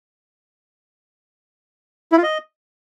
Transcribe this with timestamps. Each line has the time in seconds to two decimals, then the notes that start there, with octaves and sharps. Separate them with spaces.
2.12 E4
2.17 F4
2.23 D#5